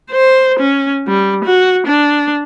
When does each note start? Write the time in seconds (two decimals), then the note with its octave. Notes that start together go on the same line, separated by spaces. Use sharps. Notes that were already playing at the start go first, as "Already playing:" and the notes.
0.11 C5
0.59 C#4
1.07 G3
1.44 F#4
1.87 D4